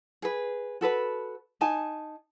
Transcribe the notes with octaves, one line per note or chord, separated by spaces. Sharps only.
G#4 B4
F#4 A4 B4 B5
D#4 G#5 A5